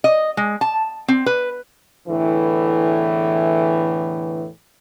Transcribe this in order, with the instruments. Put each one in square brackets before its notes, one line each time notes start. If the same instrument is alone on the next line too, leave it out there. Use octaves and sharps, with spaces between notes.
[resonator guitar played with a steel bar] D#5
G#3
A5
C4
B4
[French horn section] E2 A2 D3 E3